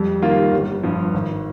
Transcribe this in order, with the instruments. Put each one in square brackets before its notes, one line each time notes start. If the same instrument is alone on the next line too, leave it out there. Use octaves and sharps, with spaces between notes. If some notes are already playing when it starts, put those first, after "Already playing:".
Already playing: [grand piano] F2 [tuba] G3
[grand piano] D#3 A#3 F4
G1
G2 F3
G#1